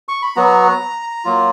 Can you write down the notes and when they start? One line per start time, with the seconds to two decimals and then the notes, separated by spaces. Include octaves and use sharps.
0.09 C#6
0.22 B5
0.36 F#3 B3 F#4 A#5
1.25 F#3 A#3 F4